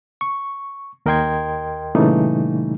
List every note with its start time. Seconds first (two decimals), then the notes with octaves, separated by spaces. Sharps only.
0.21 C#6
1.06 D#2 A#4 D#5 G5 C6 G#6
1.95 A#2 C#3 E3 G3 A3 D#4